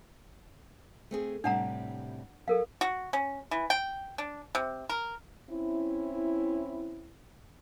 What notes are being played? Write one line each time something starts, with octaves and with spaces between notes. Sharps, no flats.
A3 C4 G#4
A2 C3 G3 D4 F#5 A#5
F#3 A4 A#4 F5
F#4
C#4
E3
G5
D4
C3
A#4
C4 C#4 E4